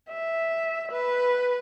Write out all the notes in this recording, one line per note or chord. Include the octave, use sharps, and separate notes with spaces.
E5
B4